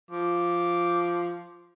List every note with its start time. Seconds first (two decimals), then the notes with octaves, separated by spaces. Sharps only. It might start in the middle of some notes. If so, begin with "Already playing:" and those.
0.11 F3 D6